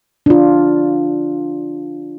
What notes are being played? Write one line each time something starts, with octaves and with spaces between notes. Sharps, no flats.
D4 F4